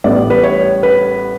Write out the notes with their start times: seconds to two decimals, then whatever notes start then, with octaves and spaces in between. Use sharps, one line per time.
0.04 A1 A2 G3 B3 D5
0.30 B4
0.43 C#5
0.83 B4